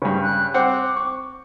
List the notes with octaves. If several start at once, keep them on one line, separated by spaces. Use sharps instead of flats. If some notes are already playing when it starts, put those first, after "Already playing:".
G2 C#3
F#6
C4 F#5 D6
C#6